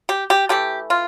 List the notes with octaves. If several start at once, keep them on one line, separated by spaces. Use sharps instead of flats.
G4
G4
E3 A3 G4
F4